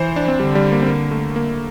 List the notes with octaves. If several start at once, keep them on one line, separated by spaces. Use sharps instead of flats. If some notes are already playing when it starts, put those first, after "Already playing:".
Already playing: E3 C5
D4
C4
D3 G3
G3
A#3
C4
A#3
A3
A#3